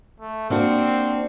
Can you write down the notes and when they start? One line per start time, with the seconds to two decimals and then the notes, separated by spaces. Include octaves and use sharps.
0.20 A3
0.50 A#3 C4 D4 F#4